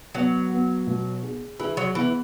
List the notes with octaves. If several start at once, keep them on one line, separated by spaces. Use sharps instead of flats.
F#3 B3
B3
B2
G#4
E3 G#4
F#3
E3 B3